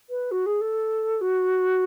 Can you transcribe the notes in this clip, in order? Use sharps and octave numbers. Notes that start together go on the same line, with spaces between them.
B4
F#4
G#4
A4
F#4